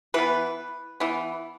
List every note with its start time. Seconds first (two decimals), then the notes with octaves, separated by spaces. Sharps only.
0.14 E3 B3 B4
1.00 E3 B3